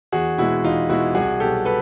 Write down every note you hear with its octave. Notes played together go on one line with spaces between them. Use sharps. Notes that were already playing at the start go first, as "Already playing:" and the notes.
E2 F#4 G#4
B2 G#3 E4 F#4
E2 D#4 F4
B2 G#3 E4 F#4
C2 F#4 G#4
B2 F#3 G4 A4
A4 B4